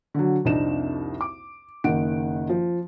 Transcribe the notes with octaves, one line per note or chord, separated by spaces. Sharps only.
D3 F#3
C2 F2 D4 D#4 E7
D6
F#1 D#3 F#5 D7
F3